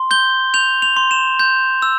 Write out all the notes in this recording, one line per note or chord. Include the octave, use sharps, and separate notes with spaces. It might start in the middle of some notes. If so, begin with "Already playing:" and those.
Already playing: C6
G6 G7
G6 F7
F7
C6
E7
G6
E6